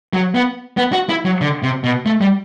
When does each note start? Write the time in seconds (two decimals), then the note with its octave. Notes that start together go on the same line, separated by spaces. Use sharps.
0.13 F#3
0.35 B3
0.77 B3
0.92 F#4
1.09 E4
1.25 F#3
1.41 D3
1.63 C3
1.84 B2
2.06 A3
2.21 G3